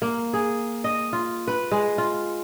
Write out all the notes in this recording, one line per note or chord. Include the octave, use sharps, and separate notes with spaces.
A#3
G#4
D#5
F4
B4
G#3
F4